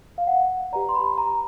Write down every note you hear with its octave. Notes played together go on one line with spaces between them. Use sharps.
F5
F#5
G4 B4 D5 A#5
C6
B5
A#5